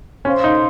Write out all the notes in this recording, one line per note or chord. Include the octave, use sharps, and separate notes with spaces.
C#4 C5 F5 C6
D#4